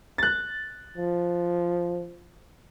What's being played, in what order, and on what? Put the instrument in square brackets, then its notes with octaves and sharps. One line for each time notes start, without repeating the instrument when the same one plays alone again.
[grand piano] F#6 A6
[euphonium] F3